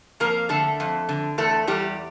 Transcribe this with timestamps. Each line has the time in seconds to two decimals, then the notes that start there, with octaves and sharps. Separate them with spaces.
0.20 F2 A#3 A#4
0.49 D3 A3 A4
0.80 F2
1.09 D3
1.38 E2 A3 A4
1.67 E2 G3 G4